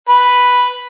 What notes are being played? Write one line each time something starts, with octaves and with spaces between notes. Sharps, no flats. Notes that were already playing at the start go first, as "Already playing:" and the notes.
B4